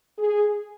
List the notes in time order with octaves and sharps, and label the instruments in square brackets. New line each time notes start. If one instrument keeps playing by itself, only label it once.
[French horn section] G#4